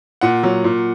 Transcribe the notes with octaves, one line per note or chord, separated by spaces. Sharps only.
A#2 F#5
F#3
A#2